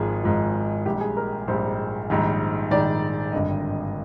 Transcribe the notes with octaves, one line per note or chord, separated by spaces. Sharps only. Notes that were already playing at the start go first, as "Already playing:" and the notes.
Already playing: G#1 G#2 F3 G#4
G#1 G#2 F3
A#1 G#2 G3 G4
G#4
A#4
A#1 G#2 G3 C5
A#1 G#2 D#3 G3
A#1 G#2 D#3 G3 D5
G#1 G2 D3 G3 D#5